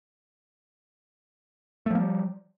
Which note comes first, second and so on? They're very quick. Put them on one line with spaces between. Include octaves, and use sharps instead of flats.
A3 F3 A#3 G3